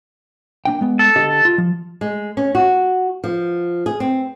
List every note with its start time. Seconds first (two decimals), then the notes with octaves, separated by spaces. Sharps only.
0.65 A#3 D4 G5
0.81 G#3 B3
0.99 A4
1.16 D3 G4 D#5
1.45 F4
1.58 F3
2.01 G#3
2.37 C#4
2.55 F#4
3.24 F3
3.86 G#4
4.00 C4